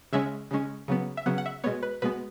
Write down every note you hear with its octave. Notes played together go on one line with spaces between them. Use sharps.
C#3 G#3 C#4 E5
C#3 G#3 C#4
C#3 F#3 B3
E5
C#3 F#3 B3 F#5
F#5
E5
B2 G#3 B3 C#5
B4
B2 G#3 B3 B4